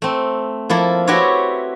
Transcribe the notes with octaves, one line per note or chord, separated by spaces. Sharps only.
A3 C4
F3 A#3 E4 A4
C4 E4 F#4 G4 B4 C#5